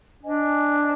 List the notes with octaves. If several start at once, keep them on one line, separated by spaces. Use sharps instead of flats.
D4 C5 D#5 G#5